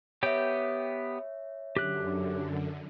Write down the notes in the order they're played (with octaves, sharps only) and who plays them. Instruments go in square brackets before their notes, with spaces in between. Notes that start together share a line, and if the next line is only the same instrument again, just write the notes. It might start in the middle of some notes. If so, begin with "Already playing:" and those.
[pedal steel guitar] B3 G4 G5 [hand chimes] C#5 E5
[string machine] F#2 D3 [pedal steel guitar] G4 F#6